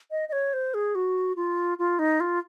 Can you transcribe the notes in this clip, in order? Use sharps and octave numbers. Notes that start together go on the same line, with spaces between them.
D#5
D#5
C#5
C5
G#4
F#4
F4
F4
D#4
F4